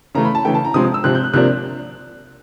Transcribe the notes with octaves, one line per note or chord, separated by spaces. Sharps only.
C#3 E3 A3 A#5
B5
A5
C#3 E3 A3 G5
A5
A#5
C3 F3 G#3 C4 D#6
D#6
E6
C3 F3 G#3 C4 F#6
G6
F#6
C3 F3 A#3 D4 F#6